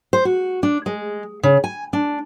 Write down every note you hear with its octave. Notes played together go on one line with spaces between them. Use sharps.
C5
F#4
D4
G#3
C#3
G#5
D4